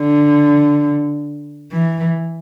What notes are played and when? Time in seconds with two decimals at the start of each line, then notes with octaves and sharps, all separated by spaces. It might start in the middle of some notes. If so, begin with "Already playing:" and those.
Already playing: D3
1.71 E3